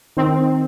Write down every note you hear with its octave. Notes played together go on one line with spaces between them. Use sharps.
D#3 C4